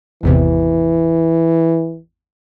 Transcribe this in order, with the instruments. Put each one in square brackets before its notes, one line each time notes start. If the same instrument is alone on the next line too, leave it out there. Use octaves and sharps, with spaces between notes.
[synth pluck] G#1 E2 C3 [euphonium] E3